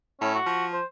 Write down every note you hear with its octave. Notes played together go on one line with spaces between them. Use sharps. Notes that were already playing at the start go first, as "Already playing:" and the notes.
A2 C#4
F#4
F3
C5